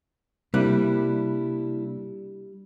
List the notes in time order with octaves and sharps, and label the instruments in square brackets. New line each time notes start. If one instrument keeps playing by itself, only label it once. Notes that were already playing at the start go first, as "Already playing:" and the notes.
[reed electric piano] C3 A#3 F#6 [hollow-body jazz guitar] G3 [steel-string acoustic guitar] D4 E4